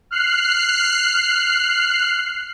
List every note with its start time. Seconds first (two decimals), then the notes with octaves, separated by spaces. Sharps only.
0.11 F6 F#6 C7